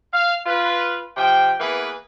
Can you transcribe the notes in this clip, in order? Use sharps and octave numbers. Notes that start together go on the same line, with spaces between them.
F5
F4 B4
C3 F3 G5
E3 A#3 B3 G#4 B4